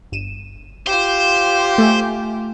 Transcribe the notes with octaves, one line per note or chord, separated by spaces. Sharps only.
G1 D#7 E7
F4 G4 C5
A3 E5 G#5